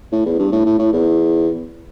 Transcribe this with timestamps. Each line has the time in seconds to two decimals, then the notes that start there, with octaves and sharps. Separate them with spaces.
0.12 A2
0.26 E2
0.39 G2
0.52 A2
0.65 A2
0.79 A2
0.93 E2